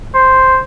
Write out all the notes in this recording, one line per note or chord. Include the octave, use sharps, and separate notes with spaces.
C5